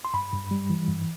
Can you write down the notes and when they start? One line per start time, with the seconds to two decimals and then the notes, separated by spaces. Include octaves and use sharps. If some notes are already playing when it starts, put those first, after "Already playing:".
0.05 C6
0.14 G2 B5
0.33 G2
0.51 G3
0.70 E3
0.88 G2